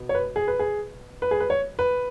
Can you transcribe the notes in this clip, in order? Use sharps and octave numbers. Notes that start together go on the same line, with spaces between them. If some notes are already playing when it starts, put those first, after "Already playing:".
Already playing: B2 B3
C#5
B4
G#4
B4
G#4
B4
G#4
B4
C#5
B4